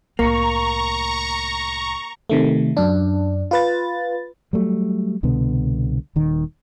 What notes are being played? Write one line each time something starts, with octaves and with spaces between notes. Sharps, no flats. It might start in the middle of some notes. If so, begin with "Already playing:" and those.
C2 A2 A#3 A#5 C#6
C3 D#3 A3
F#2 D4
F4 B4 A6
F#3 G3 A3
C2 B2 D3 B3
D#1 D#3